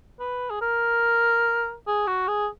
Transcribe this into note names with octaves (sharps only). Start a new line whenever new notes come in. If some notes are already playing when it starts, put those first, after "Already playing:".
B4
G#4
A#4
G#4
F#4
G#4